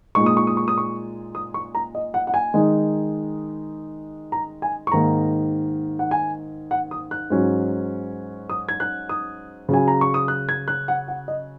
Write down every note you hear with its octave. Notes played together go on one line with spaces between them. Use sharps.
A#2 G#3 D#4 C#6
D#6
C#6
D#6
C#6
D#6
C#6
D#6
C#6
A#5
D#5
F#5
F#5
G#5
D#3 G#3 D#4
A#5
G#5
C#6
G#2 D#3 A#3 A#5
F#5
G#5
F#5
D#6
F#6
G#2 F#3 C#4
D#6
G#6
F#6
D#6
C#3 F#3 C#4 G#5
A#5
C#6
D#6
F#6
G#6
F#6
F#5
F#5
D#5